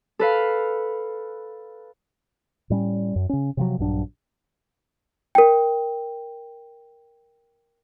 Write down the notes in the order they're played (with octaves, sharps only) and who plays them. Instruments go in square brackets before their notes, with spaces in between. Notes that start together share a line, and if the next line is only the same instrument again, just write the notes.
[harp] A4 B4 F5
[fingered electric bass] A2 G3 C#4
F#2
C#3 C#4
C3 F3 F#3
A#1 G2 F#3 D4
[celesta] A#4 G5